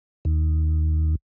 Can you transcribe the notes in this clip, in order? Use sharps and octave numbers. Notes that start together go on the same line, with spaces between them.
D#2